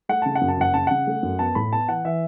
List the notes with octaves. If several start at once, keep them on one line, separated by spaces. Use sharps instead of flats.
A3 F#5
C#3 A5
F#5
F#2
A5
F#1 F#5
C#3 A5
C#3 F#5
A3
F#2
B3 A5
A2 B5
B3 A5
E3 F#5
E3 E5